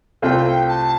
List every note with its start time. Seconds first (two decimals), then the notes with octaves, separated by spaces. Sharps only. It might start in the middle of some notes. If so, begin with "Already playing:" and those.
0.22 C2 C3 A3 C4 F4 G5
0.68 A5